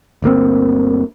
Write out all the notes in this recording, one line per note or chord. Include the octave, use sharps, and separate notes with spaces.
G1 D2 A#3 C4